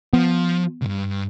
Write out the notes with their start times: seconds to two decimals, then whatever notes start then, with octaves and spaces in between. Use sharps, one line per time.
0.13 F3 B3
0.82 C2 G2